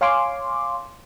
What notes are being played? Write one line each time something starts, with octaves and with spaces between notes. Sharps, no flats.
C#5 F5 G#5 C6 D6